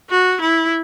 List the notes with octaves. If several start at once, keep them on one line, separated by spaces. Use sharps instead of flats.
F#4
E4